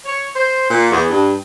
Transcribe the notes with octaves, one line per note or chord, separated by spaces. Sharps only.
C#5
C5
A#2
E2
G2